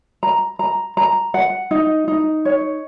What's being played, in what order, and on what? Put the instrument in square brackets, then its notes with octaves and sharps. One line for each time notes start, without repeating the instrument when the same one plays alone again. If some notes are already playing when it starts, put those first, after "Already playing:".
[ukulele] A#5
A#5
A#5
F#5
D#4
D#4
C#5